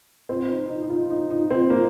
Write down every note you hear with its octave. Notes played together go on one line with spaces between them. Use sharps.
C4
D#4
D#4
D#4
F4
D#4
D#4
C4
A#3